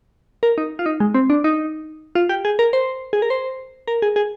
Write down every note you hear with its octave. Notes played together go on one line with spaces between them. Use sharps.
A#4
D#4
F4
D#4
G#3
C4
D4
D#4
F4
G4
G#4
A#4
C5
G#4
A#4
C5
A#4
G#4
G#4